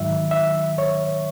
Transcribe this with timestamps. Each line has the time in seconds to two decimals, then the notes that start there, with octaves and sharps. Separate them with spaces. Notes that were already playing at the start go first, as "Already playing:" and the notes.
Already playing: G#2 D#3 F#3 E5
0.31 E5
0.78 C#5